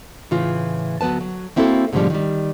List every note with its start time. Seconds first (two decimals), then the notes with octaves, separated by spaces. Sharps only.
0.31 A2 C#3 E3 F4
1.01 D2 F#3 B3 B4 A5
1.21 F#3
1.56 A#3 C4 E4 F#4 G#4 A4
1.93 G#2 B2 D3 E3 F3 G3
2.10 D#3 G3